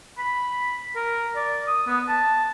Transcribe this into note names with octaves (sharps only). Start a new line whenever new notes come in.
B5
A#4
D5
D#6
B3
A5